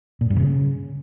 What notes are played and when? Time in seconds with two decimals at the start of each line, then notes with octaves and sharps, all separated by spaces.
0.21 A#2
0.30 G2
0.40 C#3